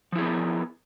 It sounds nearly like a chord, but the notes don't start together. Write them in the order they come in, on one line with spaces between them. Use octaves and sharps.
F3 E4 G#4 B3 A#4